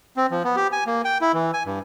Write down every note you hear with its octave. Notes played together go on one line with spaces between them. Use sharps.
C4
F3
B3
G4
G#5
A#3
G5
E4
E3
G#5
G2